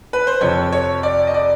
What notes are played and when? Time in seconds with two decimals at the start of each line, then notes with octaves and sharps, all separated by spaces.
0.13 B4
0.27 C5
0.41 F2 C3 F3 C#5
0.72 C#5
1.03 D5
1.27 D#5
1.34 D5